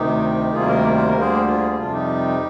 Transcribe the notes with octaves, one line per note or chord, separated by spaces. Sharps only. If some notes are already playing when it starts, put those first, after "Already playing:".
Already playing: D2 C3 D#3 D#4 G4
D2 C3 D#3 G3 A#3 F4 G#4
G4 A#4
C5
A#4
D2 D3 G3 A#3
G#4 C5
G4
F4 G#4
F2 C3 G3 D4 F4
D#4 G4